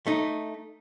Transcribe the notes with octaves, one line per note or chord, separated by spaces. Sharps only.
A3 D#4